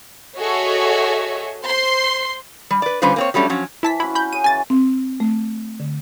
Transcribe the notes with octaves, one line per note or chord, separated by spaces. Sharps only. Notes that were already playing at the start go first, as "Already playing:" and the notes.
F#4 G#4 A4 C#5 D#5 E5
C5 C6
G3
B4 D5
D3 G3 C#4 F4 B4 C5
A#3 C4 C#5
F#3 G3 A3 C#4 D4
F3 F#3 C#4
E3 E4 C5 A5 B6
C#4 E4 F#4 F5 B5
B5 G6
C#4 G#4 C#5 D#7
C#3 E3 G#5 A6
C4
A3
D3